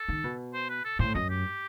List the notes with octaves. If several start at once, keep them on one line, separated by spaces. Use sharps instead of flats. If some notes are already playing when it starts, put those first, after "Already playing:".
Already playing: A4
D#3
B2
C5
B4
A4
A2 C5
F#2 D#5
G4